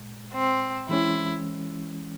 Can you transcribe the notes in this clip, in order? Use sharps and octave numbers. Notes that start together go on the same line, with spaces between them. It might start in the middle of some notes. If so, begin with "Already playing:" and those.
Already playing: A#2 G#3
C4
E3 G#3 C#4 E4